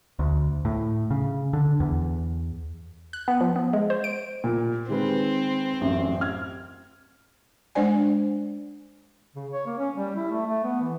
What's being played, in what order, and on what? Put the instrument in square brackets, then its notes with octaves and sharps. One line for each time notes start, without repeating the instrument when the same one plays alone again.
[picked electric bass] D2
A2
C#3
D3
E2
[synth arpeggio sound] F#6
B3
F3
B3
G#3
C5
D7
[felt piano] A#2
[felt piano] D#3 G#3 B4 [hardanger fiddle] C4
[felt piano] A1 F#2
F6 G#6
[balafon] G#3 D4 C5 D5 G#5
[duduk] C#3
C#5
A#3
C#4
G3
E4
A3
A3
B3
E3